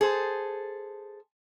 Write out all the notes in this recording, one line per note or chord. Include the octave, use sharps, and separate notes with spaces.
G#4 A4 C5